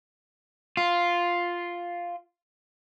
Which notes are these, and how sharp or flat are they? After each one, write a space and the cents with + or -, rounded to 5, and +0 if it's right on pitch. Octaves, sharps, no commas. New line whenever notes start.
F4 +0